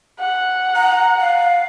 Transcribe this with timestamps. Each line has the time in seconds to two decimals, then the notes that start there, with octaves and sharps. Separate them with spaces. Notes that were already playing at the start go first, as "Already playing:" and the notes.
0.19 F#5
0.75 A#5
1.20 F5